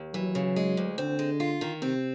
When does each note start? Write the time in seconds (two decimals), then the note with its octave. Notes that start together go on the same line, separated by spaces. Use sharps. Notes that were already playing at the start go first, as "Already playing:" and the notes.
Already playing: D#2
0.14 E3 F#3
0.35 C#3
0.56 G#3
0.77 D2
0.98 D3 C4
1.19 G#3
1.40 F4
1.61 D#3
1.82 C3 C4